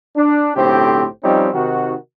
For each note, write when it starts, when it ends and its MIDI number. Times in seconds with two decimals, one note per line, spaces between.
0.16 0.54 62
0.56 1.06 35
0.56 1.06 45
0.56 1.06 50
0.56 1.06 60
0.56 1.06 67
0.56 1.06 72
1.24 1.49 53
1.24 1.49 55
1.24 1.49 60
1.24 1.49 61
1.24 1.49 63
1.54 1.94 48
1.54 1.94 51
1.54 1.94 66